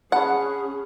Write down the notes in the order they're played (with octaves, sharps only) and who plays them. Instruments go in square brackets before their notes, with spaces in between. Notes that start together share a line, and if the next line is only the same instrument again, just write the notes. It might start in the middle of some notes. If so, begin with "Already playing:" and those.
[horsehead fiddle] C#4 G#4 [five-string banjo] F#5 [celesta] A5 B5 C#6